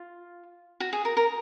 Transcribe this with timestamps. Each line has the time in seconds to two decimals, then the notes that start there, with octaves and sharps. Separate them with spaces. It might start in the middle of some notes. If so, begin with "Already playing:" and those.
Already playing: F4
0.80 F#4
0.93 G#4
1.05 A#4
1.17 A#4